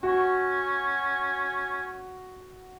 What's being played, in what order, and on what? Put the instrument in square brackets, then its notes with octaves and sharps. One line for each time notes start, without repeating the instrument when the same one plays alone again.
[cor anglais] C#4 [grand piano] F#4